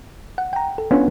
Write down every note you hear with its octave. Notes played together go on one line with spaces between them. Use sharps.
F#5
G5 A#5
A4
B3 C#4 D4 F4